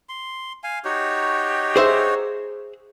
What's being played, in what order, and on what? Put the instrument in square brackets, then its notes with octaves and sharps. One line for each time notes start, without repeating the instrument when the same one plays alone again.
[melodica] C6
F5 G#5
[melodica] D#4 F#4 C#5 [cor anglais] G4
[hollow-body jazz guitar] G#4 C5 E5